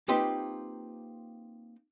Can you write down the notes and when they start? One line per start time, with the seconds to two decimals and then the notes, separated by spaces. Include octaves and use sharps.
0.08 A#3 C4 D#4 F4 G4 B4